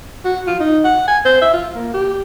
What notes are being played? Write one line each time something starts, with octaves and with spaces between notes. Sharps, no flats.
F#4
F4
D#4
F#5
G#5
C5
E5
F4
A#3
G4